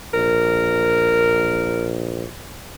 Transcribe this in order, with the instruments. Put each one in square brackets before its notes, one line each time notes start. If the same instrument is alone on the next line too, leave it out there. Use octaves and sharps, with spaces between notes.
[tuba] A#1 [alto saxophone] A#4